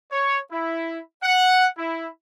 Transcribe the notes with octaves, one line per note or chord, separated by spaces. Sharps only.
C#5
E4
F#5
E4